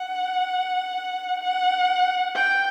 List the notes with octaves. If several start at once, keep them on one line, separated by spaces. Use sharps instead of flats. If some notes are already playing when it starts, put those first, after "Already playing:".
Already playing: F#5
F#5
G5